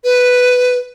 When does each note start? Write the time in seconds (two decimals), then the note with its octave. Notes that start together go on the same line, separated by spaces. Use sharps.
0.04 B4